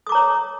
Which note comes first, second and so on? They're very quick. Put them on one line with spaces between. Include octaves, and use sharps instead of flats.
D#6 D6 A#5 C#5